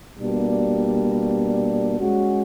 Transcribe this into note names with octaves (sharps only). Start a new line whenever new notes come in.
B2 G3 A#3 D4
G#3 C#4 F#4